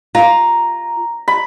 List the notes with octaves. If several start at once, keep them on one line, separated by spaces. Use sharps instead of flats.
F4 A#5
B5